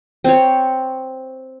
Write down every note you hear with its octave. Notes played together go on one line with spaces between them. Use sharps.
C4 C#5